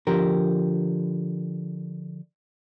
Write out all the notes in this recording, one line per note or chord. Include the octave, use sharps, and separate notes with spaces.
D3 F3 G4 A#4